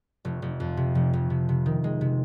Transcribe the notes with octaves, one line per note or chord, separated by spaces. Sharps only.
F1
F1
F2
C3
F1
F1
C3
C3
D#3
G#3
C3